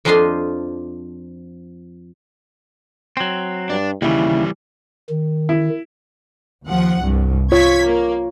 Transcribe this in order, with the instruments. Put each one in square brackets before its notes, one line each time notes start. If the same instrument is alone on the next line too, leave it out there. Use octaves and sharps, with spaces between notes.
[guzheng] F2 F3 D4 F4 D#5 C6
[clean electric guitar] F#3 C4
[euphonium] G2 [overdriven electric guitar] D4
[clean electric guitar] D#2 C#3 [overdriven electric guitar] E3 G3 [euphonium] E4
[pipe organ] D#3
[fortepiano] E4
[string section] D#2 F3 F#5
C2 G2
[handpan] F4 C#5 [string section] C#6 G#6 B6
[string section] A#3